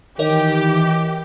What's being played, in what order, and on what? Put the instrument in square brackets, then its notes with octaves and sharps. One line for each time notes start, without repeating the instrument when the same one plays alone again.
[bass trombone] D#3 [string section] E3 G4 [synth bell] A#4 C#5 D#5